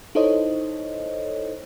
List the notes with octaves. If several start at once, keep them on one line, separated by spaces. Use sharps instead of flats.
D#4 E4 A4 C5 C#5 D#5